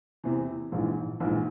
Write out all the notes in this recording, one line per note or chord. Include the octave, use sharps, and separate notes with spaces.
E2 C3 E3
A#1 G#2 E3
A#1 G#2 E3